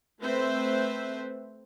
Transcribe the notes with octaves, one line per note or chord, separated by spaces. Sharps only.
A3 C4 B4 C5 E5